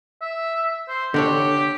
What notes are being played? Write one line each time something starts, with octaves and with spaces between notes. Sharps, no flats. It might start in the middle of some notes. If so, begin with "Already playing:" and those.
E5
C5
D3 D4 G4 C#5